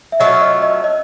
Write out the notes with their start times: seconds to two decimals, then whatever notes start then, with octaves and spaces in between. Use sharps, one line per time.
0.12 E5
0.20 F#3 A3 C#4 F4 D#5
0.41 D#5
0.62 D#5
0.84 D#5